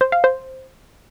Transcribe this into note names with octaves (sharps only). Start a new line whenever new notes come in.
C5
F5
C5